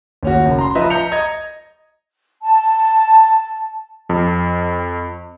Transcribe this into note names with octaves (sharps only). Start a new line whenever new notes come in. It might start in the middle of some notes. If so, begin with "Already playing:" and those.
D#2 C#4 F#4
F#1 F#2
A#5 C6
F3 B4 D#5 E5
A#5 G6 C#7 F7
D#5 G#6
A5
F2